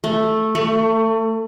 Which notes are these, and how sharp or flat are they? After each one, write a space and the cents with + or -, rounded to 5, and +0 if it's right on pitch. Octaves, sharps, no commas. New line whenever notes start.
A3 +0
A3 +30